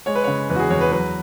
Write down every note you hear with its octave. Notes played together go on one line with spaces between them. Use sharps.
G#3 C#5
B4
C#3 C#5
E2 B4
F#4
G#4
E2 C#5
B4
F#3 B4